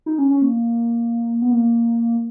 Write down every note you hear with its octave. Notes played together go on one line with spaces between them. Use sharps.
D#4
C#4
C#4
A#3
B3
A#3